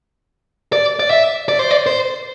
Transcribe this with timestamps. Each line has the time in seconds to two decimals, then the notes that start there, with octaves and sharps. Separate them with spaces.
0.73 D5
0.99 D5
1.10 E5
1.49 D5
1.59 C5
1.71 D5
1.86 C5